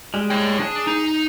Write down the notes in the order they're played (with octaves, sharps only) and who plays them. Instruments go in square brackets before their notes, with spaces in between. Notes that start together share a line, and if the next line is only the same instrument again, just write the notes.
[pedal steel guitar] G3 G#3
[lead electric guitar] C#5 G5
[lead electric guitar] D4 [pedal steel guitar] G#4
[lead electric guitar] D#4